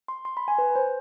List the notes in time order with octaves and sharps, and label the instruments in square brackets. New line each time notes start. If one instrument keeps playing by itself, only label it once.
[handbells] C6
C6
B5
G#5
B4
C5